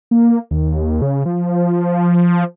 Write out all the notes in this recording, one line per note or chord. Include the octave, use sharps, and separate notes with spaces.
A#3
D#2
C#3
F3